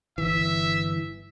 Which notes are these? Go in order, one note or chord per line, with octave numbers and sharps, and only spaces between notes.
G1 E3 E5